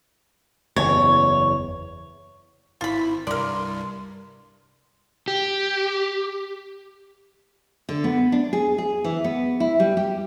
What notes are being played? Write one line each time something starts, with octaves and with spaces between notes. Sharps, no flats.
F#1 E2 C#5
G#1 E4 F4 B5
C2 G2 A#4 D5 C6
G4
D3
B3
D4
G#4
G#4
E3
B3
E4
G3
G4